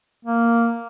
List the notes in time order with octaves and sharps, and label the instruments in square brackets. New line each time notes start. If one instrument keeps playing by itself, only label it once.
[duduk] A#3